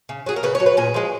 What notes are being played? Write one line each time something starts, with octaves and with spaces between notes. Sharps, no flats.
C#3
F#3 G#4
A#4
C#3 B4
C#5
F#3
B4
A#2 G#4
F3 G#3